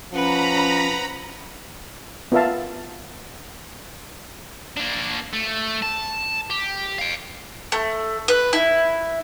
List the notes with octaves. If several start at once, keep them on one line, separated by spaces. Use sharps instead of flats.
F3 C#4 B4 F#5 A#5 B5
B3 F4 A#4 E5 F5 A5
A#3 D4
A3
A5
G4
F5 G5
A3
B4
E4